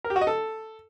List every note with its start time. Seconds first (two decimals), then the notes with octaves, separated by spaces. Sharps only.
0.04 A#4
0.10 G4
0.16 F#4
0.21 D#5
0.27 A4